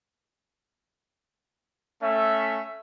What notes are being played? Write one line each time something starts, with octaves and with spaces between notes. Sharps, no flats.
A3 C#4 E5